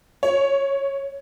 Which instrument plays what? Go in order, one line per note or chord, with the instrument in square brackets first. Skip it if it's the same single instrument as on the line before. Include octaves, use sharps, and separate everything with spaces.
[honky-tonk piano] C#5